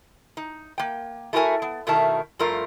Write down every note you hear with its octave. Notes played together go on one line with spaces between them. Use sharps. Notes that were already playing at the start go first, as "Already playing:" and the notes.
D#4
A#3 G5
A3 E4 F#4 A#4 G#5
B3
B2 D#3 A3 E4 A#4 A5
G2 F3 A3 F4 A#4